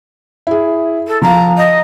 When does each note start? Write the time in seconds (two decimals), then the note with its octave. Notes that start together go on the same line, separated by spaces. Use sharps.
0.47 E4 G#4
1.07 A4
1.22 F3 F5 A#5
1.57 D#5